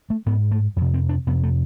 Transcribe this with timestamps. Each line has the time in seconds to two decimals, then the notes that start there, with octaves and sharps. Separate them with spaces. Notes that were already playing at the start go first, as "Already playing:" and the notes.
0.10 A3
0.26 G#2 B3
0.52 A3
0.76 F2
0.82 C3
0.94 C4
1.09 D4
1.27 F2 C3 B3
1.43 A3